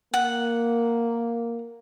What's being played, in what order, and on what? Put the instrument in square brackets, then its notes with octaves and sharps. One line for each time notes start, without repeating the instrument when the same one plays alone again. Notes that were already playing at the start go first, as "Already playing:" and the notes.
[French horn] A#3 [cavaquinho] F#5